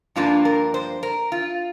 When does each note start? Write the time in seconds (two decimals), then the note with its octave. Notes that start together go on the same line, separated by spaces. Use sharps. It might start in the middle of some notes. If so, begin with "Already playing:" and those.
0.16 G2 F3 A#3 D4 F4
0.45 A#4
0.74 C5
1.03 A#4
1.32 F4